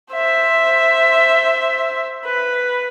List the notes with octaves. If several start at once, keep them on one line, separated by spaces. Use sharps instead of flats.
C5 E5
B4